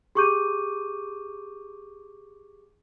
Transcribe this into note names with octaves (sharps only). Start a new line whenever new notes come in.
G4 G#4 C#6 D6 G6 D#7